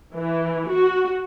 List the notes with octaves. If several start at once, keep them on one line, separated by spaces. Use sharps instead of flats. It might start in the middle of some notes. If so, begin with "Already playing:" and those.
E3
F#4